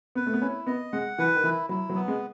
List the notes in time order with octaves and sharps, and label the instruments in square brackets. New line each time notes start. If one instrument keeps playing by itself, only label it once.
[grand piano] B3 [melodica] B4
[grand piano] A3
B3
[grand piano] C#4 [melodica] E4
[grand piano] B3 [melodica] D#5
[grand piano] G#3 [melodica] F#5
[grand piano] E3 [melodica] B4
[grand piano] D#3
[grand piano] E3 [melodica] E4
[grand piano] F#3 [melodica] E4
[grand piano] F#3
[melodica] B3
[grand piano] G#3